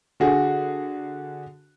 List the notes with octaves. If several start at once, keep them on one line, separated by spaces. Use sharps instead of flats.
D3 F#4 G#4